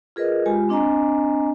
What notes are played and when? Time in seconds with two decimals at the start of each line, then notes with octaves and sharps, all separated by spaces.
0.16 F4 G#4 A#4 B4 D#5
0.46 G#3 F4 G4 G#5
0.69 C4 D4 D#5 G#5 A#5